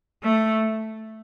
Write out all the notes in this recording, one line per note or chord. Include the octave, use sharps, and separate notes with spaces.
A3